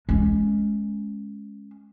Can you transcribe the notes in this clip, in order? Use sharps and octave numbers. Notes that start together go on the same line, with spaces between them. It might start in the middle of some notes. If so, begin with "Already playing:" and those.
G#3 C#4